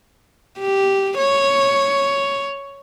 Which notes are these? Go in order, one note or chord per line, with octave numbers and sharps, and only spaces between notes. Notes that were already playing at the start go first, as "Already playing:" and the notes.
G4
C#5